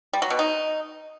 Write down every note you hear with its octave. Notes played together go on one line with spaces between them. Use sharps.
G3
F#3
B2
D#4